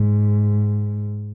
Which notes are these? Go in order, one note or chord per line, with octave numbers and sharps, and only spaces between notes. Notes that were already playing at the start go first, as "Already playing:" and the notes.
Already playing: G#2